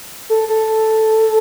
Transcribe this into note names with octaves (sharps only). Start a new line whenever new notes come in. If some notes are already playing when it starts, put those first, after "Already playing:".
A4
A4